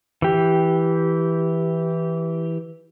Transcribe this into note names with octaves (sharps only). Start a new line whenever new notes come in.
E3 G4